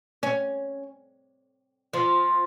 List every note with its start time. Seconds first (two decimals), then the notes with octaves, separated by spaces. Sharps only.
0.23 C#4
1.93 F3